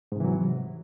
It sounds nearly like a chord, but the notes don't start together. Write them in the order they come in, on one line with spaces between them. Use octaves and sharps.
G#2 C3 E3 F#3